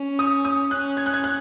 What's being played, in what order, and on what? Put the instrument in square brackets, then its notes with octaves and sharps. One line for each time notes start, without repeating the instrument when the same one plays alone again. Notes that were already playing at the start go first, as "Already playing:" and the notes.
Already playing: [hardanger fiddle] C#4
[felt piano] D#6
D#6
[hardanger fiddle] C#4 [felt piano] F#6
[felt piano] G#6
F#6
G#6
F#6